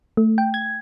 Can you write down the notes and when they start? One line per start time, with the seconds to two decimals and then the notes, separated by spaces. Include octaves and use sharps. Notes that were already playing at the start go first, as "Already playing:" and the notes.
0.17 A3
0.38 G5
0.54 G#6